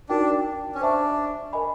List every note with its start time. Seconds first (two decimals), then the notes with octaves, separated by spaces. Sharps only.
0.09 D4 D#4 F#4 A#4 D5 G5
0.75 C#4
0.81 D4 C5 E5 A5 C#6
1.53 A#4 D#5 G#5 B5